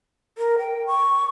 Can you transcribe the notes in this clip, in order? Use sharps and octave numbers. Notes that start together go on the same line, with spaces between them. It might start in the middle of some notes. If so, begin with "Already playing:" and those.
A#4
G5
C#6